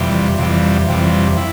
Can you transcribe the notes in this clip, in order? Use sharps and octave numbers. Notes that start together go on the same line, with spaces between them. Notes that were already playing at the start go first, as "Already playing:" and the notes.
Already playing: F2 C3 E3 G3
F2 C3 E3 G3
F2 C3 E3 G3
E4